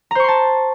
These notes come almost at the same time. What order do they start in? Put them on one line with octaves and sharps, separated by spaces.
A#5 C5 C#6 C6 A5